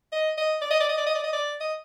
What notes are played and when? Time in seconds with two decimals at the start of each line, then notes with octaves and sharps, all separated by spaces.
0.12 D#5
0.37 D#5
0.62 D5
0.71 D#5
0.80 D5
0.89 D#5
0.97 D5
1.06 D#5
1.15 D5
1.24 D#5
1.33 D5
1.60 D#5